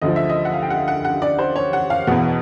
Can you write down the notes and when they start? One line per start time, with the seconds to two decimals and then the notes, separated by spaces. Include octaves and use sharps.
0.02 D2 D3 F3 D#5
0.16 E5
0.29 D#5
0.45 F#5
0.54 F5
0.62 G5
0.70 F#5
0.88 F#5
1.05 F#5
1.22 D5
1.39 C5
1.56 C#5
1.73 F#5
1.90 F5
2.07 E2 B2 F#5